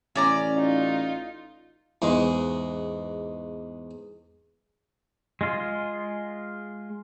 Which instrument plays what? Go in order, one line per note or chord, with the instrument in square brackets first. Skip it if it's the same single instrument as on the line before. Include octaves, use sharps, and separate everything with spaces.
[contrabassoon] A1 [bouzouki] C#4 D5 A#5
[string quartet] D#4 F4
[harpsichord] E2 G#2 G#3
[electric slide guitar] G#3 F4